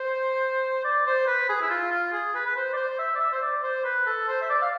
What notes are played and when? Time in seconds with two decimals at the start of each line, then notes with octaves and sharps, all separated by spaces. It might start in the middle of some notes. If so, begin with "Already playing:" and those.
Already playing: C5
0.84 D5
1.06 C5
1.27 B4
1.49 G#4
1.62 E4
1.70 F4
1.91 F4
2.12 G#4
2.35 B4
2.46 B4
2.56 C5
2.73 D5
2.77 C5
2.99 E5
3.15 D5
3.20 E5
3.32 C5
3.42 D5
3.63 C5
3.84 B4
4.06 A4
4.28 C5
4.42 E5
4.49 D5
4.62 F5